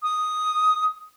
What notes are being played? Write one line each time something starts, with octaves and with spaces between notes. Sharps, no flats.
D#6